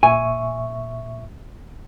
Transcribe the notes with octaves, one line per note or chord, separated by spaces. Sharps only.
A#2 E5 G#5 C#6